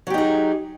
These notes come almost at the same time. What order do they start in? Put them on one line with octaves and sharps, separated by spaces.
F#3 G4 D#4 G#4